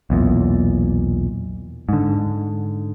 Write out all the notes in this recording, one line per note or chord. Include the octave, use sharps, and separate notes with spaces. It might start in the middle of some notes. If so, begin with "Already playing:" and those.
B1 E2 A#2
G#2 D3